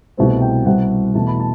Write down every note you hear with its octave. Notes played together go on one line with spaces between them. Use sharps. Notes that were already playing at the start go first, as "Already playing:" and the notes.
C2 B2 A3 C4
G5
C2 B2 G3 C4 F#5
E2 B2 A3 A5
B5
A5